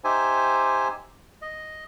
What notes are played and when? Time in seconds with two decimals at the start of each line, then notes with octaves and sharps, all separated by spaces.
0.04 D#4 G4 C5 E5 G#5
1.42 D#5